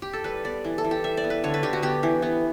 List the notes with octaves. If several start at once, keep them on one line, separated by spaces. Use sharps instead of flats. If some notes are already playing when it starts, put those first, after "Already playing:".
G4
A4
G3 B4
B3 D5
E3
A4
E3
G4
G3 E5
D5
B3
B4
D3 C#5
B4
D3 G4
F#4
B3 G4
E3
B3